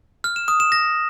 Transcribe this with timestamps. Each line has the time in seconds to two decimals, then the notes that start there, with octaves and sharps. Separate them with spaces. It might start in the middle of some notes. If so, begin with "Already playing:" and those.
0.24 F6
0.36 E7
0.48 D#6
0.60 E7
0.72 A#6